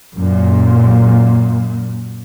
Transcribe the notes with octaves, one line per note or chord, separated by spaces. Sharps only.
F#2 A#2